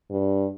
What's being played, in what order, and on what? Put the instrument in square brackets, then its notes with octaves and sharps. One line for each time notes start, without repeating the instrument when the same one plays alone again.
[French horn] G2